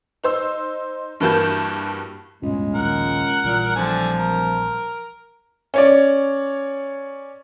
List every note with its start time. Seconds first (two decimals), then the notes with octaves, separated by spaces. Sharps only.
0.24 D#4 C5 E6
1.20 G2 E3 A#3 F#4 A5 G6
2.42 D1 C#2 G2 B2 G#3
2.75 A#1 D#2 A#4 F#5
3.44 A#1 A#2 E3 G3
3.76 D1 D3 F3 G#5
4.18 A#4
5.74 C#4 C#5 D5